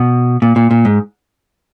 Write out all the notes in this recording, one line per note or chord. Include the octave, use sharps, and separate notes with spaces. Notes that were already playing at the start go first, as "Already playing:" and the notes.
Already playing: B2
A#2
A#2
A#2
G#2